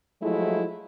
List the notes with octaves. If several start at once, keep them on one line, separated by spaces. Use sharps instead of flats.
F3 F#3 G#3 A3 E4